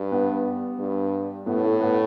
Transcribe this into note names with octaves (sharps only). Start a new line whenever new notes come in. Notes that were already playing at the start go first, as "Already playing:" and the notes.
Already playing: G2
B3
G2
A2 B3
A3
B3